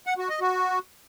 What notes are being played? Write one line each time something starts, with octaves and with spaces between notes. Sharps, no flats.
F#5
F#4
D#5
F#4